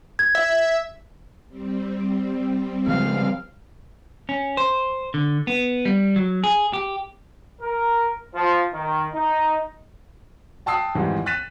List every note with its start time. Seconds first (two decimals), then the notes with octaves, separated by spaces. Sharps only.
0.19 G#6
0.35 E5
1.49 G3 C4
2.87 C#3 F3 G#3 F5
4.29 C#4
4.57 C5
5.14 D3
5.47 B3
5.85 G3
6.16 F#3
6.44 G#4
6.73 G4
7.62 A#4
8.35 F3
8.74 D#3
9.15 D#4
10.66 G5 A5 D#6 E6 C7
10.95 F2 G#2 D#3 E3 G3
11.26 F#6 A6 B6 D#7 E7